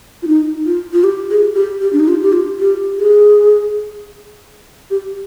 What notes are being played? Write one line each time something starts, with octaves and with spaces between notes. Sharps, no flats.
F4
D#4
F4
F4
G4
G#4
G4
G4
D4
D#4
F4
G4
F4
G4
G#4
G4